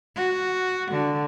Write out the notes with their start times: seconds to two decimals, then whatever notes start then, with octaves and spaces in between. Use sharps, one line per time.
0.16 F#4
0.91 D3